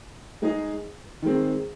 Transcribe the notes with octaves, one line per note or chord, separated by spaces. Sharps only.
G#3 D#4 G#4 D#5
D#3 G#3 C4